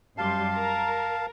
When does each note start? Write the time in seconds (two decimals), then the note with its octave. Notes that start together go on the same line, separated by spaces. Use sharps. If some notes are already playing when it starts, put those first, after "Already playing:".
0.18 F#2 G3 F5 A5 C6
0.55 A#4